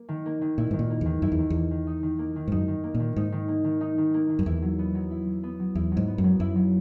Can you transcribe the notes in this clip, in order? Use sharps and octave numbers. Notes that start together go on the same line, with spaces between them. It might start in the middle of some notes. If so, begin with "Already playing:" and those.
Already playing: A#3
D#3
A#3
D#3
A#2 E4
G#2 D#3
A#2
A#3
E2 D#3
F#2 E4
E2
D#3
E2 A#3
D#3
D#4
D#3
A#3
D#3
G#2
F#2 D#4
D#3
A#3
A#2
D#3
G#2 D#4
D#3
A#3
D#3
D#4
D#3
A#3
D#3
F#2
E2 E4
F#3
B3
F#3
E4
F#3
B3
F#3
E2 E4
F#3
G#2
B3
F#2
F#3
F#2 E4
F#3